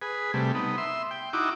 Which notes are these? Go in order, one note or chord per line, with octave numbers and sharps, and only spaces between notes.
G#4 B4
C3 G3 A3
B3 D#4
E5 C6
G5
D#4 E4 F#4 D6